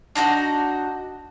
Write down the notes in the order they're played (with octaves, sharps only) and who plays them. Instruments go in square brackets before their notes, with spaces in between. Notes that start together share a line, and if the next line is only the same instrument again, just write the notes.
[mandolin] D4 D#4 F4 F#4